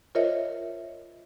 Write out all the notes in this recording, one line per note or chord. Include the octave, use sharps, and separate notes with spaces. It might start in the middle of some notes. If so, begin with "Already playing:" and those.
F4 A#4 C5 C#5 D#5 E5